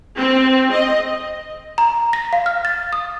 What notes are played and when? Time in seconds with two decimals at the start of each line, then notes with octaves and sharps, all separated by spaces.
0.17 C4
0.72 D#5
1.78 A#5
2.13 A#6
2.33 F5
2.46 F6
2.65 A6
2.93 D#6